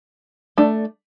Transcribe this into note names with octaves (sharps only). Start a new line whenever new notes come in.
A3 D4